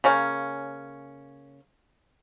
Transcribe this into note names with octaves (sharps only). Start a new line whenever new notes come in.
C#3 A#3 C#4